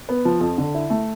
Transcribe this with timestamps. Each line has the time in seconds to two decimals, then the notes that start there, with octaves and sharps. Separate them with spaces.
0.09 B3
0.25 F3
0.40 F2
0.58 D3
0.74 E4
0.90 A3